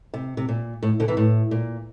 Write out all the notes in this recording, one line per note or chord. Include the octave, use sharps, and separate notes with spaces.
C3
C3
A#2
A2
A#2 D3
C3 E3
A2
A#2